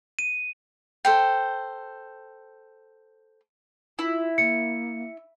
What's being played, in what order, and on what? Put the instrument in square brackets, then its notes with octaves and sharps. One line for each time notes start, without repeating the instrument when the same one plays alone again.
[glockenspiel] D#7
[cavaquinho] A4 C5 G5
[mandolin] E4 [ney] F4
[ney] A#3 [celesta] C#7